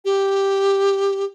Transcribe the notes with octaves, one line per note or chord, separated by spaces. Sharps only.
G4